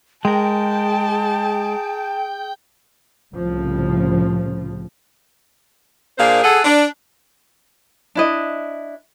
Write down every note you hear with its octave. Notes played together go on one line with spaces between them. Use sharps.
G#3 G#4 A#4 G5 A5
C2 A2 C#3 F3
A#2 A#3 D4 G#4 C5 F5
G#4 A4 F#5
D4
D4 E4 D#5